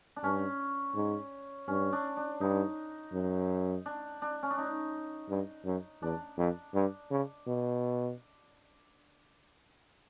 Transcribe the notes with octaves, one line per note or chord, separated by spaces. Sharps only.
D4
G2 C#4
G#2
G2 C#4
D4
D4
G2 D#4
F#2
D4
D4
C#4
D4
D#4
G2
F#2
E2 D4
F2
G2
C#3
B2